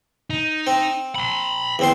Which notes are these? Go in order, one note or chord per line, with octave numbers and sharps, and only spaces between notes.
D#4
C4
B5 C6
E2 C4 C6